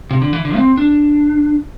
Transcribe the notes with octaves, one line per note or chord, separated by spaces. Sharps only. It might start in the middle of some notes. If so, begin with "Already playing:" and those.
C3
D3
E3
D3
C4
D4